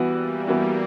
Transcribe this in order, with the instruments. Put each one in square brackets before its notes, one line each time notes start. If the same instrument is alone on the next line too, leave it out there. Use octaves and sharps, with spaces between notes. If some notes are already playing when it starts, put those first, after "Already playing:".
Already playing: [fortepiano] E3 B3 F#4 [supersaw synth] G3
[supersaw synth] A#3
[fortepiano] E3 B3 F#4